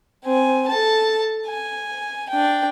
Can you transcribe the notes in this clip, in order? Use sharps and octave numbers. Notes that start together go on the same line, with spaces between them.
C4 G#5
A4 A5
G#5
D4 G5